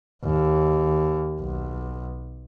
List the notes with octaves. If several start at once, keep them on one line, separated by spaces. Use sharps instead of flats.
D#2
B1